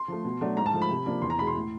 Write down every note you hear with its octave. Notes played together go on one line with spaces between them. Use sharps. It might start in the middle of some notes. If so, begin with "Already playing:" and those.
Already playing: C6
F3 A3
B2
F#3 A3 D4
G#2 A#5
A5
F3 A3
B5
C3
F3 A#3 D4
E2 C6
A#5
B2 G#3 B5
C6
A2